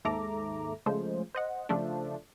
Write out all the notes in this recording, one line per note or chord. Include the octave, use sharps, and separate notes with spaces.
D#2 G#2 A4 E5 A#5 D6
C#3 F3 G#3 A3 C5
C5 D#5 F#5
C#3 F3 A3 D4